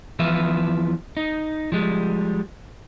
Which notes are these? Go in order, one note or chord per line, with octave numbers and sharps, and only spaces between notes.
E2 E3 F3 B4 E5 F5
D#4
F3 G3 G#3